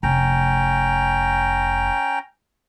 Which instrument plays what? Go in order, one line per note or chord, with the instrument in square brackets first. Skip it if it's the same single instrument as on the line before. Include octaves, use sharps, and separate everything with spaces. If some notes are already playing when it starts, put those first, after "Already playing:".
[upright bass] F1 [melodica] C#4 G5 A#5